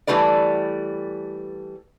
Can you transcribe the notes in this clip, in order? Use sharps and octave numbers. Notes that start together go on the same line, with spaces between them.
E3 G3 A3 B4 D5